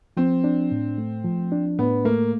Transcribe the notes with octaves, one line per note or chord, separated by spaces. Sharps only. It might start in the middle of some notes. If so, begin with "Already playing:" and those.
F3 C4
D4
A2
A3
F3
D4
A2 B3
A3 A#3